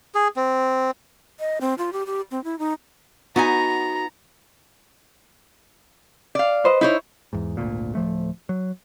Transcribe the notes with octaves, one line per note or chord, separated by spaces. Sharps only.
G#4
C4
D#5
C4
F4
G4
G4
C4
E4
D#4
B3 D#4 F#4 G#5 A#5
D5 F5
B4 C5 D#5
D#4 E4 C5 C#5
E2 G#2
G#1 D2 A#2
D1 F3 A3
F#3